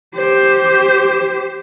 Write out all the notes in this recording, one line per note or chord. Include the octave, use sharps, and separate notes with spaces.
G4 C5